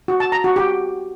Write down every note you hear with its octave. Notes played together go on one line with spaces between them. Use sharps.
F#4
A5
A#5
F#4
G4